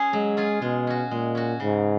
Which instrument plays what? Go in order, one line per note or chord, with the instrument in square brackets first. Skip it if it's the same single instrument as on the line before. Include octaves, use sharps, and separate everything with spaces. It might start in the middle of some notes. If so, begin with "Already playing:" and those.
Already playing: [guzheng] C#4 G#4
[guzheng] F#3 [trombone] G#3
[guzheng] C#4 F4 G#4
[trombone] B2 [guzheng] G#3
[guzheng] C#4 F#4
[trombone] A#2 [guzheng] G#3
[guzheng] C#4 F#4
[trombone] G#2 [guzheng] C#3